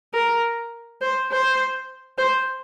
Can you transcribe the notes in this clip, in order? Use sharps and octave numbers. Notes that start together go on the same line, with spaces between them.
A#4
C5
C5
C5